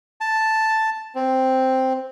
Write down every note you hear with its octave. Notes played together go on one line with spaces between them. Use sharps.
A5
C4